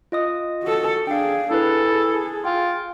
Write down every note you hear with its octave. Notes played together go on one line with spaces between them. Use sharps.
F4 D#5 D#6
F#4 A4
D4 G#4 F5 G5
E4 G#4 A4 B4
F4 G5